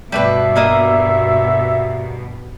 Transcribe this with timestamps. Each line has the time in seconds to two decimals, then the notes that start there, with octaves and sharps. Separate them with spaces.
0.12 G2 B2 G3 A3 B4 E5
0.56 G3 A#3 D#5